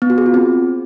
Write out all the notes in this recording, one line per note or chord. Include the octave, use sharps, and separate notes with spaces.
B3
F#4
G#4
F4
C4